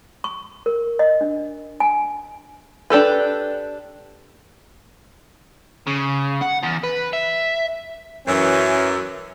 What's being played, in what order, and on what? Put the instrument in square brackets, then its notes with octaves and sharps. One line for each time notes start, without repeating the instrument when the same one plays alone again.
[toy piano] C#6
A#4
D#5
D4
G#5
[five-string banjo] D4 G4 A4 B4
[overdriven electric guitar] C#3
F#5
E2
B4
E5
[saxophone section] F#2 E3 [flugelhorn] C#4